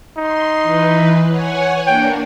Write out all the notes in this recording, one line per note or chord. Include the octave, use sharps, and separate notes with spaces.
D#4 C6
E3 B4
C#5 F#5 G#5
A#3 D4 G5